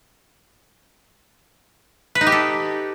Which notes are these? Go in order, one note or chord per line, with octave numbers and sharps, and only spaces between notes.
B4
D#4
G4
A4